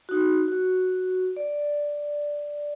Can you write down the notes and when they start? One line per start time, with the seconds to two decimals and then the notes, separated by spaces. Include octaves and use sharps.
0.09 D#4 F#4
0.48 F#4
1.36 D5